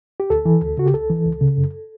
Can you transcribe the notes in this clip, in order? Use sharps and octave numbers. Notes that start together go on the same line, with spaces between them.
G4
D2 A4
E3
D2
C#3 F#4
G4
C#2 A4
E3
C#2
C#3
F#2